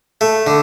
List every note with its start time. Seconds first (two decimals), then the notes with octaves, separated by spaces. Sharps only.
0.21 A3
0.47 D3